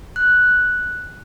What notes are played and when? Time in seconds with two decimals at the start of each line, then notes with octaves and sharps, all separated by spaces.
0.16 F#6